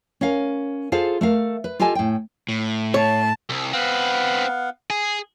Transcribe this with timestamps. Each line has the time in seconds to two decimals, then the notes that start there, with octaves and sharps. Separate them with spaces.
0.21 C#4 A#4 F5
0.92 F4 G#4 A4 C5 F5
1.21 A3 A#4 F5
1.64 B4
1.80 F4 G4 A4 D#5 G#5 A5
1.95 A2 G5
2.48 A2
2.94 C#5 A5
3.50 C2
3.73 B3 C4 B4 F5 F#5
4.90 G#4